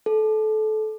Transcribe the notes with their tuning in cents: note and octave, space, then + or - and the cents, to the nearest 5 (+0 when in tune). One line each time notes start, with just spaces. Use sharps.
A4 -25